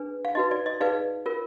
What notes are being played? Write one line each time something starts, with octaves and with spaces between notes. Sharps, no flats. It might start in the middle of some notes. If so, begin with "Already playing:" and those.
Already playing: D4 G#4 B4
F5
D#4 F#4 B4 D#5
D5
D#5
D#4 G#4 B4 D5 F5
F4 A#4